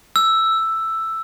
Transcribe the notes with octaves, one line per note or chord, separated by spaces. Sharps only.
E6